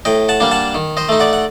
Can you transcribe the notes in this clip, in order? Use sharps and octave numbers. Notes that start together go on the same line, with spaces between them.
A2 D#5 G5
F#5 A5
G3 A#3 D4
F#5 A5
D#3
C5 D#5
A3 D#4
D5 F#5
F#5